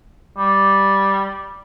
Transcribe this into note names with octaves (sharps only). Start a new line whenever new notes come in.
G3